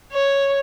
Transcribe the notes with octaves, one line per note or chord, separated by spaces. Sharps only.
C#5